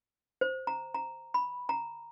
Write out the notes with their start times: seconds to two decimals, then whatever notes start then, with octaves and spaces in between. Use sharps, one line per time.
0.41 C5
0.67 A#5
0.95 A#5
1.34 B5
1.69 A#5